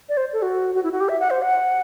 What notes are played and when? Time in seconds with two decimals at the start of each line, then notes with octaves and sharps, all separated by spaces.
0.09 D5
0.17 C5
0.33 A4
0.42 F#4
0.75 F#4
0.83 E4
0.92 F#4
1.00 G4
1.09 E5
1.20 F#5
1.30 C5
1.42 F#5